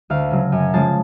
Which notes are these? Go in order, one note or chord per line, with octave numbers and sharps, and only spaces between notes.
D2 F5
C#3 F#3
F#2 G#5
C#3 F3 G#3 A5